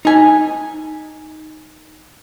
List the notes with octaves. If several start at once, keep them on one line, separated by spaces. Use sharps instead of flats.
D#4 G#5